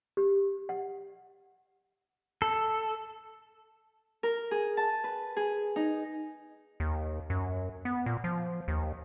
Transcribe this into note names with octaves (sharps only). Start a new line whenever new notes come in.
G4
F#5
A4
A#4
G#4
A5
B4
G#4
D#4
D#2
F#2
B3
A#2
F3
D#2